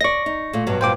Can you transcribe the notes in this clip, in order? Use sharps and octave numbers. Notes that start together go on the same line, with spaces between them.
D5 D#5 C#6 A#6
D#4
A#2 A3
G2 B2 F#3
G2 A#2 F#3 C5 G5 D6